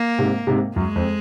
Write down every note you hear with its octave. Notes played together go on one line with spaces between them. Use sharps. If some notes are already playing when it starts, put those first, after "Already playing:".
Already playing: A#3
G#2 C3
G#2 C3
F#2 G#3
F2